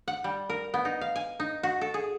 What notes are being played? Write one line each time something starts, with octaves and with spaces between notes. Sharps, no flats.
F#5
G3
A#4
B3
D#4
F5
G#5
D#4
F#4
A4
G#4